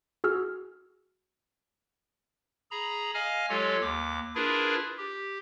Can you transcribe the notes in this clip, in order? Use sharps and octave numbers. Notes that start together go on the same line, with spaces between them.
F#4 G#4 E6 F6
G#4 A#5 B5
D#5 F5 G#5 F6
F#3 G#3 F4 G4 A4 C#5
D#2 D6
D4 E4 F4 G#4 A#4 B4
G4